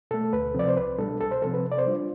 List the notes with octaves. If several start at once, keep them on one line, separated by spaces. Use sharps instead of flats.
B2 A3 A4
D2 B4
C3 F3 C4 D5
C5
C2 B4
B2 G3 D4 A4
C2 A4
C5
C3 F3 C4 A4
B4
C3
D5
C5
G3 D4 F4